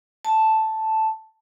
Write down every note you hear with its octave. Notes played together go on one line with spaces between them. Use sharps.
A5